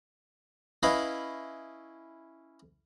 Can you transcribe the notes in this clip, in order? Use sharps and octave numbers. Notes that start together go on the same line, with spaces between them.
C#4 E4 B4 D#5 F5 B5